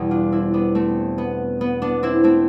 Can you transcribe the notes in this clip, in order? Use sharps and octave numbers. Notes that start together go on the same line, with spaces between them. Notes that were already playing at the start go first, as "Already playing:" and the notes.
Already playing: E2 B2 G3
D4 F4
C4 E4
B3 D4
A3 C4
B3
B3
B3 D4
C4 E4
A3 C4